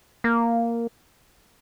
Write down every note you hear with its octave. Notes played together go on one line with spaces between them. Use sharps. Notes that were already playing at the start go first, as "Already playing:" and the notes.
A#3